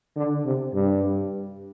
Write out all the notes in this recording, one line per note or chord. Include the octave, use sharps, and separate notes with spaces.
D3
C3
G2